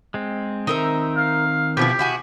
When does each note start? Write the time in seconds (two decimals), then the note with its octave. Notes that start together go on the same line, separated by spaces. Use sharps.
0.14 G#3 C4
0.67 D#3 C4 D#4 A#4 E5
1.16 F5
1.77 B2 F3 E4 G4
1.99 E4 F#4 G#4